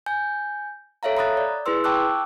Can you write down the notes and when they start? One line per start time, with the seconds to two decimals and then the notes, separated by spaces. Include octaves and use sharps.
0.06 G#5 G6
1.03 A4 C#5 E5 F5 A#5
1.17 A#5 B5 D#6 F#6 A6
1.37 D5
1.66 E4 G#4 B4 C6 E6
1.84 G5 A5 C#6 D6 E6 F#6